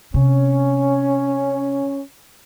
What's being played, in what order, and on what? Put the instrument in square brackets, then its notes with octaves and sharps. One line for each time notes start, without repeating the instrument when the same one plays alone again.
[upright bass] C3 [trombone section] C#4